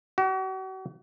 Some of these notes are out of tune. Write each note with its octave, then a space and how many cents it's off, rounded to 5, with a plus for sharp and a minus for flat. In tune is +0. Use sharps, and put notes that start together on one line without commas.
F#4 +40